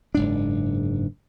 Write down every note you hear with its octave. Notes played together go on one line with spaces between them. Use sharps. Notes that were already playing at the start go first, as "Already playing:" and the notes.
F#1 G#2 D4